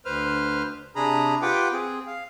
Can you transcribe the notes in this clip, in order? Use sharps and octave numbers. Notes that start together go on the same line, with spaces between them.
D2 B4 C5 F6
C3 D4 G#4 A#5 B5
F4 G4 B4 F#5 G5 D6
C4 G#4
F5